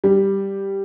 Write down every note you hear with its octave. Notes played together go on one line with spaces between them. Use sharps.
G3